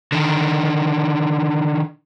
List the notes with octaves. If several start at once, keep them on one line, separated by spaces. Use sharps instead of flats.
D3 D#3